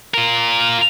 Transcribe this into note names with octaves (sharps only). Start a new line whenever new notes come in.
F4 A#4